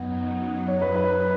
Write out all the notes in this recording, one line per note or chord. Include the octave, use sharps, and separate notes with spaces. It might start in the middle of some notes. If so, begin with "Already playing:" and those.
Already playing: F#2 F#3 B3 D#4
C#5
B4
B4